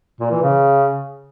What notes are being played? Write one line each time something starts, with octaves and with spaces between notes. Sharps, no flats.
A#2
E3
C#3